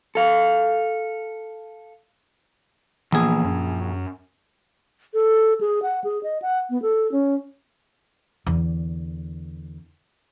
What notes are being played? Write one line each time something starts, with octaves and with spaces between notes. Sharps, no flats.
A4 F5
A#1 E3 A#3 B3 G#4
F#2
A4
G#4
F#5
G#4
D#5
F#5
B3
A4
C#4
E2 D3